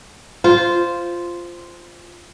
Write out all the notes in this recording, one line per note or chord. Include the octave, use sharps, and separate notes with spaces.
F4 C5